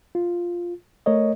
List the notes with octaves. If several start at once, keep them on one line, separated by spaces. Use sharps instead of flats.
F4
A3 A#4 C#5 D#5